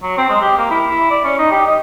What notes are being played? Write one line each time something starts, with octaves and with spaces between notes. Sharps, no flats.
F#3
C4
G#3
G4
A#3
E4
E4
D5
C#4
D#4
G4
D#5